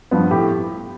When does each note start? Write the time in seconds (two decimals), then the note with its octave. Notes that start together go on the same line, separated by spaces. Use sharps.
0.11 G2 F3 B3
0.31 A2 G4